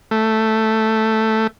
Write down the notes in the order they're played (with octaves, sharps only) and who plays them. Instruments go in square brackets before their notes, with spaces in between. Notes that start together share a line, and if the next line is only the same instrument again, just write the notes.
[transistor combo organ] A3